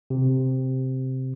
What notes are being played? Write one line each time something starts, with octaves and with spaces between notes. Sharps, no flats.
C3